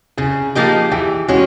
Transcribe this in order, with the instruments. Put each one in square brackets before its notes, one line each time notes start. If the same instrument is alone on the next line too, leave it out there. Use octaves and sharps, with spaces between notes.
[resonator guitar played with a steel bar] C#3 [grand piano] G#4
[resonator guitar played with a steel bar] F3 A#3 D#4 G4
[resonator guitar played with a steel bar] E3 [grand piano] G4
[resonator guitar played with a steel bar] G#3 C#4 [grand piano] F#4